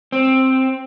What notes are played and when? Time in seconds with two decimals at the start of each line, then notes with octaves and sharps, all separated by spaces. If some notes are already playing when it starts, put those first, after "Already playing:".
0.12 C4